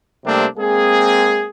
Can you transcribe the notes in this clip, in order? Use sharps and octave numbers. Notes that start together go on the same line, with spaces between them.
C3 G3 A3 A#3 C4 D4
G#3 A#3 C4 G#4